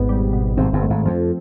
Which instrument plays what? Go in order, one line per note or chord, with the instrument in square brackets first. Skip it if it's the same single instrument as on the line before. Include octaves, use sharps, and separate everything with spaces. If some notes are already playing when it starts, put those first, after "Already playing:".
Already playing: [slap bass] G#1 G#2 [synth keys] B2 B3
[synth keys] G3
B2
[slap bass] G#1 G#2 [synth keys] C4
[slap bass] G1 G2
[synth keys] A3
[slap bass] G#1 G#2
[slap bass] F2 [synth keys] F3